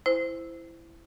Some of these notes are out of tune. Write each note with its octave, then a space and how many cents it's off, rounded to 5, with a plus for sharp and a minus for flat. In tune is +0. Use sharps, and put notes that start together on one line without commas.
E4 +15 C5 -15